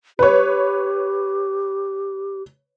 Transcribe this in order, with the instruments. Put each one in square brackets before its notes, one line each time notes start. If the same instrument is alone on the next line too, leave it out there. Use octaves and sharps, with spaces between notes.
[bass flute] G4 [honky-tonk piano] B4 C#5